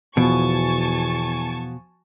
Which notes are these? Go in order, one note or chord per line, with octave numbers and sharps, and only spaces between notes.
E2 B2 F3 F#4 G#5 A5 C#6